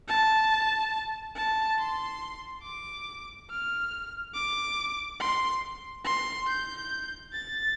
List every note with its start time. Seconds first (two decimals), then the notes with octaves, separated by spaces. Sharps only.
0.08 A5
1.36 A5
1.78 C6
2.64 D6
3.49 F6
4.35 D6
5.20 C6
6.05 C6
6.47 G6
7.33 A6